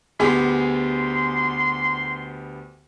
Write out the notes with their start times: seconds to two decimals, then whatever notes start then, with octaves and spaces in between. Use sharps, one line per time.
0.20 D2 B3 G4 G#4 C6